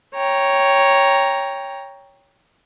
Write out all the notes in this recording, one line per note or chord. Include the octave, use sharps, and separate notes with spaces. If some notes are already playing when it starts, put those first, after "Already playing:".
C#5 G5 A#5